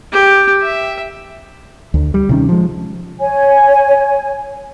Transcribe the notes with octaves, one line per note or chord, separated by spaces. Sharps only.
G4
E5
D2
G3
C3 D#3 C#4
F3 G#3
C#5 G#5